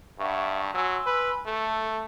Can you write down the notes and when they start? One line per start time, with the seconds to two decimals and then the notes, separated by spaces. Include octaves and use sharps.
0.19 G2 E5 F#5 C#6
0.74 F#3 G#5 C6 E6
1.06 B4
1.45 A3 A4